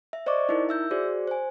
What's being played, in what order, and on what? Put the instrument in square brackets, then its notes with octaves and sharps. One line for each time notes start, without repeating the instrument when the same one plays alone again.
[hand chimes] E5
C5 D5 D#5 C#6 D6
D#4 E4 A#4
E5 E6 G6
F#4 G#4 C5 D5
C5 G#5